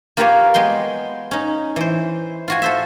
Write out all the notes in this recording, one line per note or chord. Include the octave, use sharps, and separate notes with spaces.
A#3 F4 G4 A#4 B4 C#5
G#3 B3 G5 C6
C#4 D#4
E3 C5
F4 F#4 G#5
A4 C5 E5